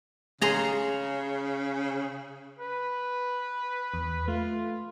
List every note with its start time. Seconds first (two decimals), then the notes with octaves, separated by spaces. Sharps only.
0.41 C#3 G#4 A#5 C6
2.59 B4
3.94 E2
4.28 A3 F4